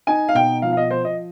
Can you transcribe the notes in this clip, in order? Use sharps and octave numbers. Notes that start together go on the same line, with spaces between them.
D#4 G#5
F5
B2 G5
F3 F5
F5
D#5
F3 C5
D#5